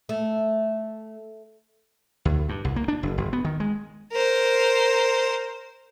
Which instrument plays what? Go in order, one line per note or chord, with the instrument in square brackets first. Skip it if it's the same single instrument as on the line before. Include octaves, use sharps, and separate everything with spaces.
[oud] A3
[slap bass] D2
G2
C2
A#3
D4
F#1
F#1
B3
D#3
G#3
[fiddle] A#4 C5